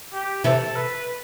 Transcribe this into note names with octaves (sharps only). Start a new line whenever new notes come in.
G4
C3 E3 A4
B4